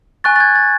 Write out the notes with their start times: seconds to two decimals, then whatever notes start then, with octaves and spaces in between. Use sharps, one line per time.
0.24 G#5 C#6 F#6 A6
0.36 A6
0.40 G#6
0.56 A6